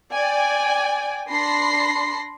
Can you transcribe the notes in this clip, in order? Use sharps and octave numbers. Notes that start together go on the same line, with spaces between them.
D5 G5 G#5
D4 B5 C6 A#6 C7